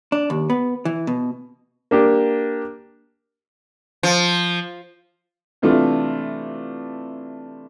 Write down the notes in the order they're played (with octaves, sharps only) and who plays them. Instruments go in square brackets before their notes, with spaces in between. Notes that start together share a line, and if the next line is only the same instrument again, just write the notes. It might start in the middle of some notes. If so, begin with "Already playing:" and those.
[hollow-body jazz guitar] D4
D#2
B3
E3
B2
[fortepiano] A#3 D4 G4
[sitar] F3
[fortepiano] C3 E3 A3 D4 F4